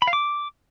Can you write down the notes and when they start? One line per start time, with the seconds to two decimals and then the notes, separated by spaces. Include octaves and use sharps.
0.02 B5
0.07 F5
0.13 D6